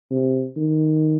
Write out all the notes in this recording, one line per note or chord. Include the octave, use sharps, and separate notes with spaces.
C3
D#3